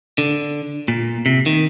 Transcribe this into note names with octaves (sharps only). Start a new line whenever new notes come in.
D3
A#2
C3
D#3